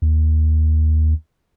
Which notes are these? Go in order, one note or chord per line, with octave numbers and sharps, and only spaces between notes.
D#2